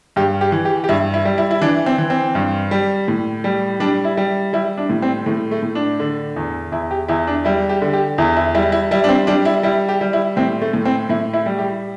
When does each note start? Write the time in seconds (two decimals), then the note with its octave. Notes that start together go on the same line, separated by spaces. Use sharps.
0.16 G2 G4
0.41 G4
0.52 E3
0.65 G4
0.84 G4
0.89 G2 E4
1.14 E4
1.25 G3
1.38 E4
1.51 E4
1.61 E3 D4
1.86 C4
1.98 E3
2.10 C4
2.35 G2
2.71 G3
3.08 A2
3.44 G3
3.80 G3 D4
4.04 E4
4.17 G3
4.53 G3 E4
4.77 D4
4.90 A2
5.02 C4
5.26 A2 A3
5.51 A3
5.63 A2
5.75 D4
6.00 D3
6.36 E2
6.72 E2 E4
6.91 G4
7.08 E2 E4
7.27 D4
7.45 G3 E4
7.69 G4
7.82 D3
7.93 G4
8.18 E2 E4
8.36 E4
8.55 G3 E4
8.72 E4
8.91 G3 E4
9.04 D4
9.09 C4
9.27 G3 D4
9.45 E4
9.63 G3 E4
9.89 G4
10.01 G3
10.13 E4
10.37 A2 C4
10.61 A3
10.73 A2
10.85 C4
11.09 A2 E4
11.33 E4
11.46 G3
11.58 G4